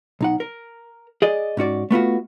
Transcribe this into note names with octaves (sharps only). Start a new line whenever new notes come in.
B1 D#4 F#5
A#4
G#4 D5 D#5
G#2 C#4 F#4 D5
A3 B3 F4 F#4